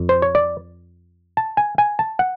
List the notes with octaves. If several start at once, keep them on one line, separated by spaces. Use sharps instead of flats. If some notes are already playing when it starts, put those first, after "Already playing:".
Already playing: F2
C5
C#5
D5
A5
G#5
G#5
A5
F#5